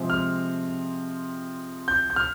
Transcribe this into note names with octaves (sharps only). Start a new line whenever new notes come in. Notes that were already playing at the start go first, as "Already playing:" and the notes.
Already playing: C3 F3 G#3 C4
F6
G6
G6
F6